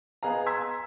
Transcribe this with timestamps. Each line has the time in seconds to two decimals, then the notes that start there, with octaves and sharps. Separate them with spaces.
0.23 B3 G#4 D#5 F5 A#5
0.46 A#5 C6 E6 G#6 B6